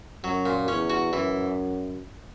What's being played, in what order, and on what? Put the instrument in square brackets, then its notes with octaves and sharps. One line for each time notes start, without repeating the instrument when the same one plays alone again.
[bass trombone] F#2 [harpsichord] F#3
[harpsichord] A#2
[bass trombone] E2 [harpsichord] C#4
[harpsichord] F#4
[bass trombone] F#2 [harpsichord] E3